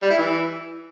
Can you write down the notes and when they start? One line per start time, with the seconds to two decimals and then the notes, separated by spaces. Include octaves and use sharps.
0.03 G3
0.10 E4
0.18 E3